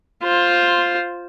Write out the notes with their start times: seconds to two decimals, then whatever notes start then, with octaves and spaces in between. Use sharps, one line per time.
0.23 F4 C5